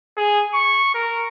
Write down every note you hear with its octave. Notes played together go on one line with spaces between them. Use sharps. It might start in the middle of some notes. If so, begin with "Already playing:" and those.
G#4
C#6
A#4